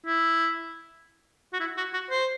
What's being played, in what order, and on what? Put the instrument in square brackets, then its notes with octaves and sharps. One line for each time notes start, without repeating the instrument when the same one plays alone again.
[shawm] E4
F#4
E4
F#4
F#4
C5